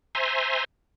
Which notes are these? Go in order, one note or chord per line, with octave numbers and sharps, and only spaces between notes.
C5 E5 G#5 A#5 C6